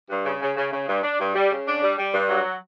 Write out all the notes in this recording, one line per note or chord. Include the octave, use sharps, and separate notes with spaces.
G2
C#3
C#3
C#3
C#3
G2
D4
G2
G3
C#3
D4
G3
G3
G2
F#3